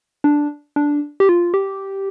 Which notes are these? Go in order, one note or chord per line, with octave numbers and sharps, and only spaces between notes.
D4
D4
G4
F4
G4